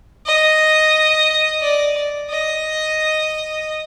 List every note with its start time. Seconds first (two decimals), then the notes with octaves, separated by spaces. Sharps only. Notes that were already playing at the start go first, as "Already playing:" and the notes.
0.26 D#5
1.62 D5
2.30 D#5